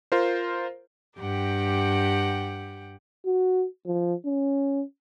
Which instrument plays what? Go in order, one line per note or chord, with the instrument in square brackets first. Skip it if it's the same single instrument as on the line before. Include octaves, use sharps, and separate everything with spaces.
[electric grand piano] F4 A#4 C5
[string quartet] G2 G4 F#5 G5
[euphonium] F#4
F3
C#4